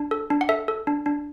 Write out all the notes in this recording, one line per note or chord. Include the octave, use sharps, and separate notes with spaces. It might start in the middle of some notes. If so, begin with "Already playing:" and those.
Already playing: D4
A4
D4
F#5
A4 E5
A4
D4
D4